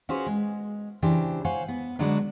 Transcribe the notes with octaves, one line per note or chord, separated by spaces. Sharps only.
C#4 F4 F#4 G#4 B4 C5
G#3
C#3 E3 D4 G4 C5
C5 C#5 F5 F#5 G#5
B3
D3 F#3 G#3 D4 F#4 B4